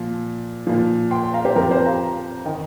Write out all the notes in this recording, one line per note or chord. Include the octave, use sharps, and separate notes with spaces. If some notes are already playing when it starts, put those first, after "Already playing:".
Already playing: A#2 F3
A#2 F3
G5 C6
F5 A#5
G4 C5
F2 F3 F4 A#4
G4 C5
F5 A#5
D#3 D#5 G5